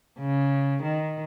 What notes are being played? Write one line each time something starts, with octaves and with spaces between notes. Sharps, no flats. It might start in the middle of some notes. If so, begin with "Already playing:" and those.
C#3
D#3